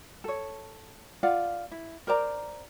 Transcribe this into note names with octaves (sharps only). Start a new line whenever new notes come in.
A4 C#5
F4 D5 F5 F#5
E4
A#4 C5 D5 A#5